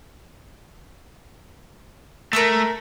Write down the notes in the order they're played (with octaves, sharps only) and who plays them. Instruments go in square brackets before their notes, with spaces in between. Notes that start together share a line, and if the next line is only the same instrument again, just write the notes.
[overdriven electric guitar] A3 [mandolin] A#4 A5 E6